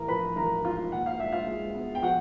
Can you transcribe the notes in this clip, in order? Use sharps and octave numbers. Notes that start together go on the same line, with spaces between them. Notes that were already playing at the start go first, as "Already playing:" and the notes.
Already playing: A1 A#4 A#5
F3 B4 B5
A1 A#4 A#5
G#2 F4 F5
A#2 F#5
F5
G#3 E5
F4 F5
G#3
B3
G5
F3 F#4 F#5